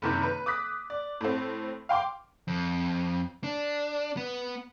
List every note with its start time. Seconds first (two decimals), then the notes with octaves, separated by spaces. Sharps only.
0.02 F#1 C3 D#3
0.23 B4
0.46 D6 D#6 F#6 B6
0.90 D5
1.21 A2 C4
1.89 F5 G5 C6 D6
2.48 F2
3.44 D4
4.17 B3